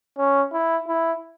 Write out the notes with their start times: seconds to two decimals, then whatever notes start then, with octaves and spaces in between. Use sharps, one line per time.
0.18 C#4
0.52 E4
0.88 E4